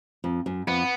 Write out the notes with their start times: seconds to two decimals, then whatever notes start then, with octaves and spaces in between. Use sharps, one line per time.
0.24 F2
0.46 F#2
0.67 F2 B3